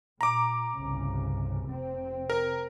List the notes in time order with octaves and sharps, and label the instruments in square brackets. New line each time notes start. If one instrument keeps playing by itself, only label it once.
[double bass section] A#2 [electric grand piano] A#5 D6
[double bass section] G1 C2 C#3
F1 C3 C4
[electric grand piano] A#4